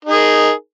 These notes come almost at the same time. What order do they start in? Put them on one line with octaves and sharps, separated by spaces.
D#4 G#4 A#4